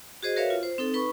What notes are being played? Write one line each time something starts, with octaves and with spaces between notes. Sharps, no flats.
F#4 G#4 C5 D#5
F#4 A#4 B4 C#5 E5 F5
F4
C5
C4 D#4 A4
D#4 B4 B5 C#6